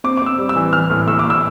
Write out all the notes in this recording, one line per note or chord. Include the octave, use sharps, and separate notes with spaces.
C4 D6
D6
C4 E6
G3
E6
E3
E3 F6
A2
A2 E6
A2 D6
E6